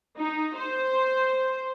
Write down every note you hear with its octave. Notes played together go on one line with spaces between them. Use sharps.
D#4
C5